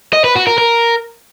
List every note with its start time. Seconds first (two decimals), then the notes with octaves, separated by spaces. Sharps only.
0.13 D#5
0.24 B4
0.36 F#4
0.47 A#4
0.58 A#4